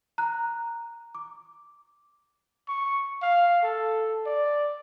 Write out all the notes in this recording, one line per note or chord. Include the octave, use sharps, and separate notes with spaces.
A#5 F#6
D6
C#6
F5
A4
D5